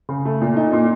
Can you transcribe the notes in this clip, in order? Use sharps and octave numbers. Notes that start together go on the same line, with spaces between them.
C#3
A3
A#2
D#4
A#2